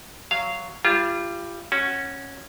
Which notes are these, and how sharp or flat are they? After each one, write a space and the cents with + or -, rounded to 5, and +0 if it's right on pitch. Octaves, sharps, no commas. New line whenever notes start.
F#3 +0 F5 -15
G3 +0 F4 -30
C#4 -10 F#4 +0